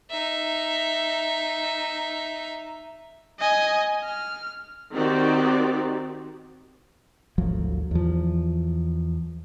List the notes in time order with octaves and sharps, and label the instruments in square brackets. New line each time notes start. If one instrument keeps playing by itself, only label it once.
[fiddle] D#4 E5
[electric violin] D#5 G#5
F6
[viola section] D#3 C4 F#4 G4 D5
[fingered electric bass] G#1 D2 F3 F#3
E2 F3